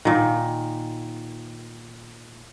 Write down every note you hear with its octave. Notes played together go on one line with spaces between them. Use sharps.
A#2 D#3